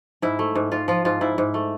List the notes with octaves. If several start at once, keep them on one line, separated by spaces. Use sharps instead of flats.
G#2 E4
A3
G#2
G#2 F4
F3 F4
G#2 F4
G#2 E4
G#2
A3